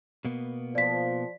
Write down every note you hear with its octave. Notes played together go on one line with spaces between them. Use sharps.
B2 A#3 B3
F3 D5 B6